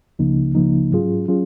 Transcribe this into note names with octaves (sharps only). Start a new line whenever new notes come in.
C#2 C#3 F3 A#3 D#4
C#2 C#3 F3 A#3 D#4
G#2 F#3 C#4 F4 G#4
F#3 C#4 F4 G#4